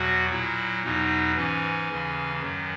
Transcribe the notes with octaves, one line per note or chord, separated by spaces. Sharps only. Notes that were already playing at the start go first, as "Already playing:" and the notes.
Already playing: E2 B2 F#3 F#4
A#2 F#3 E4
E2 B2 F#3 D#4
G#2 E3 C#4
D#2 C#3 E3
F#2 D#3 F#3